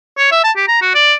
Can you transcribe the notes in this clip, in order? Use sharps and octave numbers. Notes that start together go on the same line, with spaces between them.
C#5
E5
A5
G4
A#5
F#4
D5